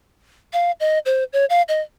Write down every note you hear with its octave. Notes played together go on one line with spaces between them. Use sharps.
F5
D#5
C5
C#5
F5
D#5